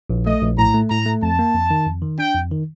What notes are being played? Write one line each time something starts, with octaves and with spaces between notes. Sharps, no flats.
A#1
A3 D#5
A#1
A2 A#5
A3
A2 A#5
A3
F2 A5
A#3
F2
D#3
F2
D#3
D4 G5
F2
D#3